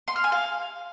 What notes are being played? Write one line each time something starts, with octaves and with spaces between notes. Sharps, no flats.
C6
F6
G#5
F5